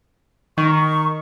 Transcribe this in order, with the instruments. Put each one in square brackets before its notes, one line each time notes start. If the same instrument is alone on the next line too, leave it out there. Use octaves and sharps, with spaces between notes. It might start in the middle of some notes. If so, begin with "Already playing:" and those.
[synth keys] D#3 [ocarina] C#6